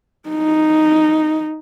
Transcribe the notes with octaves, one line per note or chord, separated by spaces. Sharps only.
D#4